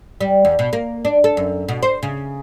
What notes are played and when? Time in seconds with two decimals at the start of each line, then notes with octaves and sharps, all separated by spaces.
0.21 G3
0.45 E2
0.59 B2
0.73 A#3
1.05 D4
1.24 A4
1.37 F#2
1.68 B2
1.83 C5
2.03 C#3